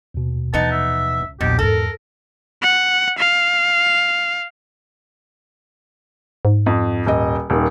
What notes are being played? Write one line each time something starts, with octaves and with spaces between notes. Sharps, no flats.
D#2 B2
E3 F3 B3 D#4 A5
E5
C#2
A#1 E2 B2 D4 G4
G#2 F3 A4 A#4
F#5
F5
G#2
F2
D#1 D#5
D#1 D#3